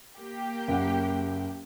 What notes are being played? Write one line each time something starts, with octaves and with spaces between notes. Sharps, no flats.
A#3 G4 G5
F#1 F#5